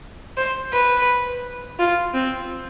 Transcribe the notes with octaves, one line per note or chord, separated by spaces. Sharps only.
C5
B4
F4
C4